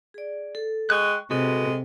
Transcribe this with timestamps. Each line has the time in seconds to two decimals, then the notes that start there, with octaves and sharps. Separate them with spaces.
0.14 G#4 D5
0.55 A4
0.90 G#3 G5 C#6 F#6
1.31 C3 G#3 F#4 A4 B4